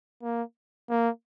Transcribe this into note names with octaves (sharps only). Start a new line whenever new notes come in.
A#3
A#3